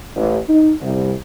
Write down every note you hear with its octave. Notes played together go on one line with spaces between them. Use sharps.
A1
D#4
C2